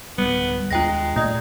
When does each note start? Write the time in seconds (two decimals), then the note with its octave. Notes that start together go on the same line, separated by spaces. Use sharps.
0.18 D1 G3 B3
0.71 D#2 G#3 C4 D4 F4 G5 A#6
1.16 A#2 A3 D#5